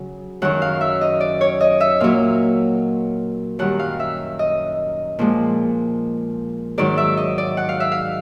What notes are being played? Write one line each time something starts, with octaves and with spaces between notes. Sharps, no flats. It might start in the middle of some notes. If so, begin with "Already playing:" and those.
Already playing: C#3 F#3
F#2 D#3 F#3 F#5
F5
E5
D#5
D5
C#5
D#5
E5
A#2 F#3 F5
F#2 D#3 G3 F#5
F5
E5
D#5
A#2 F3 G#3
G#2 D#3 F#3 D5
E5
D#5
D5
F#5
F5
E5
F5